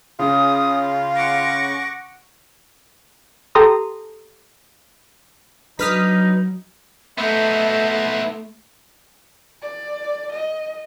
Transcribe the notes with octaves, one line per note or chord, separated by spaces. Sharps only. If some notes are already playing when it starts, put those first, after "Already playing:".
C#3 C#4 F4 D#6
F#5 C#6 D6 A#6
G4 A4 A#5 C6 D#6
F#3 D4 D#4 B4 D#6 F6 B6
A3 B3 D#4 E5 B5 C6
D5
D#5